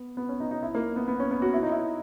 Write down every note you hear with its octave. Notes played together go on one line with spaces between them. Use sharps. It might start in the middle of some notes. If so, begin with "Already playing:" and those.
Already playing: B3
B3
C#4
D#4
D#4
E4
A#3
B3
B3
C#4
B3
F#4
E4
D#4
E4